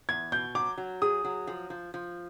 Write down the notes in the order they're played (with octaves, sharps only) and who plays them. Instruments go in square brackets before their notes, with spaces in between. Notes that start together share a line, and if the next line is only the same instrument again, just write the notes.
[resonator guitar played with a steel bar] E2 [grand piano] G#6
[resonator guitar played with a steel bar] B2 [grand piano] G6
[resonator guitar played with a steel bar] F#3 [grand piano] D6
[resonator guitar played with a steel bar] F#3
[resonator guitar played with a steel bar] G#4 [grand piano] D#6
[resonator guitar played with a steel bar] F#3
F3
F3
F3